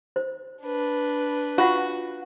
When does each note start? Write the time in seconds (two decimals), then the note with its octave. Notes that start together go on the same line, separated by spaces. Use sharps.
0.16 C5
0.63 D4 B4
1.58 F4 F#4 F5 F#5